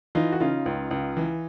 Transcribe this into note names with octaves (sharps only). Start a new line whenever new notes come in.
E3 D#4 F4
F#4
C#3 D#4 F4
C#2
C#2
E3